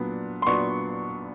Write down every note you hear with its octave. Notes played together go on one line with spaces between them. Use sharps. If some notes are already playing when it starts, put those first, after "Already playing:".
Already playing: A#2 F#3 B3 D4
C6
A#2 F#3 B3 D4 C#6